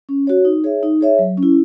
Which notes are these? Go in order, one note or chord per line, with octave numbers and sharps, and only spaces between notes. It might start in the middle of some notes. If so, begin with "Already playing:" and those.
C#4
F#4 C#5
D#4
G#4 C#5 E5
D#4
G#4 C#5 E5
F#3
C#4
E4